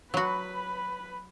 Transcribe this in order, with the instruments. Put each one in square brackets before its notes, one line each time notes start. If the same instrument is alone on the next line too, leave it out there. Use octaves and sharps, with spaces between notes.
[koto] F#3 F#4 [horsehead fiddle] B4 B5